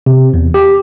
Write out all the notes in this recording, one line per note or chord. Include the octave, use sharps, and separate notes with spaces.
C3
E2
G4